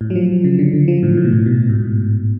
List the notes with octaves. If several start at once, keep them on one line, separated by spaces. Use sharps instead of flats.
A2
F#3
F3
C#3
D3
D3
F3
A2
A2
B2
A2
B2
G#2
A2